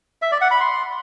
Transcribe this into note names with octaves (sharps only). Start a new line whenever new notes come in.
E5
D5
F#5
B5
C6